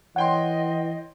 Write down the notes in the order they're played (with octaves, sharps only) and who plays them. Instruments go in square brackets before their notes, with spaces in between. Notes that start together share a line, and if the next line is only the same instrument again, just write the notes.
[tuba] E3 [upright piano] C#5 G5 C6 [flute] D#5 [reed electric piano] F#5